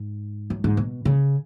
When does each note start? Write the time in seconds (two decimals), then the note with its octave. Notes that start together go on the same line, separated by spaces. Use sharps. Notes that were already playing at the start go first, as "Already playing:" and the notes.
Already playing: G#2
0.50 F#2
0.64 G#2
0.77 B2
1.05 C#3